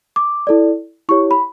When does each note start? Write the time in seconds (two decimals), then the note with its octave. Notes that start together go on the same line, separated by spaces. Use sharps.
0.16 D6
0.47 E4 A4 D5
1.09 E4 G4 C#5 C#6
1.31 B5